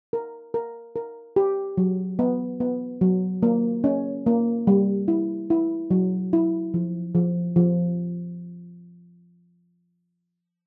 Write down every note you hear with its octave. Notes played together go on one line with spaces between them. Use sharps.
A#4
A#4
A#4
G4
F#3
B3
B3
F#3
A#3
C#4
A#3
G3
E4
E4
F#3
E4
F3
F3
F3